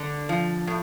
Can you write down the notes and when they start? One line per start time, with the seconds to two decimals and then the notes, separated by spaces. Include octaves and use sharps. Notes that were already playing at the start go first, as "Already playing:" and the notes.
Already playing: D3 D4
0.29 F3
0.67 A2